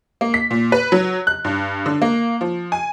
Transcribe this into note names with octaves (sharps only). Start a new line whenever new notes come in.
A#3
B6
A#2
B4
F#3
F#6
G2
D3
A#3
F3
G#5